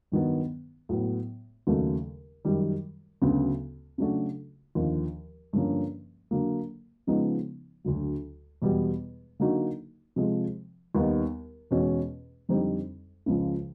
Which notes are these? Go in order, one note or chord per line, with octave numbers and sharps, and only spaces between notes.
G2 D#3 F#3 B3
A2 F#3 B3
D#2 C#3 F#3 A3
F#2 D#3 G3
D2 C#3 F#3 B3
C#3 F#3 A3 D4 F#4
D#2 D3 F3
G2 D3 F3 A#3 C#4
D3 F#3 A#3
C#3 F3 G#3 B3 D#4
D2 D3 F#3
E2 B2 G3 B3
D3 F#3 A#3 D#4 F#4
C3 F3 G#3
D#2 D#3 G3 B3 D#4
E2 B2 G#3 C#4 F#4
F2 D3 G3 C4 D#4
C#2 C#3 F3